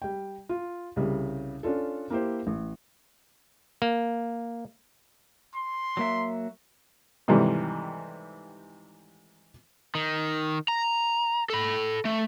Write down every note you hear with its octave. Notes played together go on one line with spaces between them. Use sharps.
G3 G5
F4
C2 C#3 G3
C#4 D4 F4 A4
A#3 E4 G4 C5
A1
A#3
C6
F#3 A#3 E5
G#2 C3 D#3 E3 G3 A3
D#3
A#5
A4 B5
A3